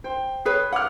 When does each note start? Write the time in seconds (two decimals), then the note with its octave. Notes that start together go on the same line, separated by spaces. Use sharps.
0.04 C5 G5
0.45 G#4 B4 C#5
0.73 F#5 D6 F6